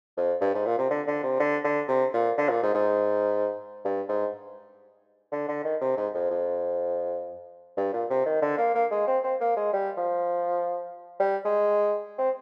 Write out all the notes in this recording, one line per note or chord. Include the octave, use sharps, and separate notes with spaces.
F2
G2
G#2
A#2
C3
D3
D3
C3
D3
D3
C3
A#2
D3
A#2
G#2
G#2
G2
G#2
D3
D3
D#3
C3
G#2
F2
F2
G2
A#2
C3
D#3
D3
A#3
A#3
G#3
C4
C4
A#3
G#3
G3
F3
G3
G#3
C4